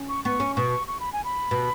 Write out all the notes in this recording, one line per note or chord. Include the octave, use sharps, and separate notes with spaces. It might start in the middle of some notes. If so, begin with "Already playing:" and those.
Already playing: C#4
C#6
B3 C#6
C#4
B2 C#6
C#6
B5
G#5
B5
B2